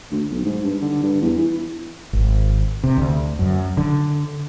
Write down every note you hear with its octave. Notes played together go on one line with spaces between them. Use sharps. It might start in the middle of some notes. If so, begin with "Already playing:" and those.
D2
B1
G#2
G2
D3
G2
E2
E3
G#1
C3
D2
F#2
D3